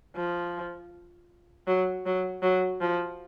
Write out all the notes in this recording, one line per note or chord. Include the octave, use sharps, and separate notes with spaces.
F3
F#3
F#3
F#3
F3